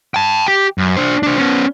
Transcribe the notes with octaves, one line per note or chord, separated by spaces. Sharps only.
G5 A5
G4
F#2
D4 C5
D4 C5
B3 C#4